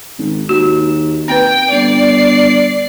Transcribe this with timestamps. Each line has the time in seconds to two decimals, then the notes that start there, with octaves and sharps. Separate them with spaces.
0.19 G#1
0.49 D#2 F#4
1.28 C4 B4 G5
1.71 G1 D5 C7